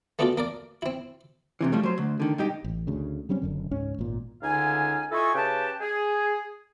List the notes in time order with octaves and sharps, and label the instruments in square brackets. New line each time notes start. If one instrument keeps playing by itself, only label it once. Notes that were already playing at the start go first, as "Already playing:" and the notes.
[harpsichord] A3 B3 D4 F4 F#4 A4
A#3 A#4 D5
C4 E4
[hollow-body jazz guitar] E2 C3 E3
F3 G3 A3
F#3 C5
D2
D3 D#3
G2 D#4 G4
[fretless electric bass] A1
D2 C#3
F#3 G3 C4 C#4
F#1 F#2 D3
C#2 G#2 C#4
G#1 A#2
[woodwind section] C#2 D3 D#4 F5 G#5
E4 F4 A4 D#5 G#5 C#6
C#3 G4 B4 G5 A5
G#4